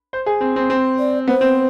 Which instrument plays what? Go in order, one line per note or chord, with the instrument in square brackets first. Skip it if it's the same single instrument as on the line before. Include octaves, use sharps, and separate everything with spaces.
[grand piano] C5
G#4
C4
C4
C4
[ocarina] D5
[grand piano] B3 [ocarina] C5
[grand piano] C4